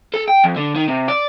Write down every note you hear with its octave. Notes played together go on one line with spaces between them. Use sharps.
A4
G5
F2
D3
D#3
C3
D5